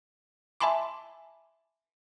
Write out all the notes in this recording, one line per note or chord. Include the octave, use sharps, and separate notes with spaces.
E5 G#5 A5 B5 C6 D6